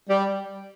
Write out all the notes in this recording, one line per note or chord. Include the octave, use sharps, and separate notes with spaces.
G3